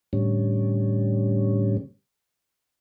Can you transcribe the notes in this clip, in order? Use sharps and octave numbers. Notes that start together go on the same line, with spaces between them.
A2 D3 G3 C#4